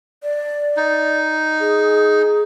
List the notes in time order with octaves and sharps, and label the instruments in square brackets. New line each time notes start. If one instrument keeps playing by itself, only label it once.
[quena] D5
[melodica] D#4
[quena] G#4